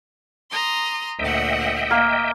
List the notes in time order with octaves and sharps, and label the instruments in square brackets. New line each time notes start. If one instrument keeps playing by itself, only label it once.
[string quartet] A#5 C6 D#6
[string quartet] D2 A#2 F#5 [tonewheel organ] D#5 E5 G5
[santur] A#3